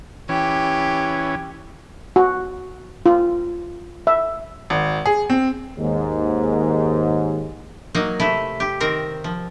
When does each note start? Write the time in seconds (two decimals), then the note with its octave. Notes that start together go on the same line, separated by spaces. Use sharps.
0.29 E3 C#4 G4
2.16 F#4
3.06 F4
4.07 E5
4.70 G#1
5.05 G#4
5.30 C4
5.77 D#2 G#2
7.95 F#3 A#3 D#4
8.20 C3 A3 E4
8.60 G4
8.80 D#3 C4 A#4
9.24 F3